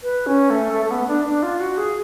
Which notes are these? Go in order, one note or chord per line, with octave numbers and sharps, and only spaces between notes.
B4
C#4
A3
A3
A3
B3
D4
D4
F4
F#4
G#4